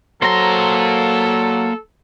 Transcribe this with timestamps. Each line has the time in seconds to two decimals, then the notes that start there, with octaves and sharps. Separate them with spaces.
0.22 F#3 A#3 A4 C5 A#5 C6